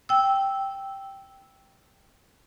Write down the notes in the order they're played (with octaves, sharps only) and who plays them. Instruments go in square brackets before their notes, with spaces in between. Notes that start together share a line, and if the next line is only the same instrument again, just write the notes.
[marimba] G5 E6